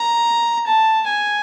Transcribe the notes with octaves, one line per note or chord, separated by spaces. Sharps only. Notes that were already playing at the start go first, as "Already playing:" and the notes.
Already playing: A#5
A5
G#5